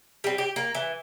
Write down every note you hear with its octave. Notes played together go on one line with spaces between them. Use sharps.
G3 C4
G4
A#3
E3